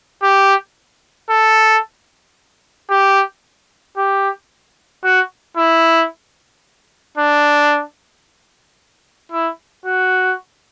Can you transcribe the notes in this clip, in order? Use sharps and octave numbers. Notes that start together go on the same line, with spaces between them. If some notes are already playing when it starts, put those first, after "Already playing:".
G4
A4
G4
G4
F#4
E4
D4
E4
F#4